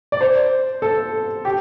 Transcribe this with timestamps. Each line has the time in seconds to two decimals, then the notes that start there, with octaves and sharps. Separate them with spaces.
0.12 D5
0.21 C5
0.82 A4
1.45 G4